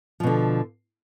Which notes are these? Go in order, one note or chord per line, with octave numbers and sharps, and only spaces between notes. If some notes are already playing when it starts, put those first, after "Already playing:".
B2 D3 F3